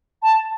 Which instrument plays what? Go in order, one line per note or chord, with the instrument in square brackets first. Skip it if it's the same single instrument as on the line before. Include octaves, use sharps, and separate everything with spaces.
[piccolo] A5